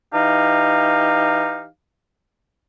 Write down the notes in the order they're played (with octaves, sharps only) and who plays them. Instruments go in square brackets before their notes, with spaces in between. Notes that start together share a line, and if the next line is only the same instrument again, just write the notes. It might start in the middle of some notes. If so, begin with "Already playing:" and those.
[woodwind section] E3 D#4 G4 F5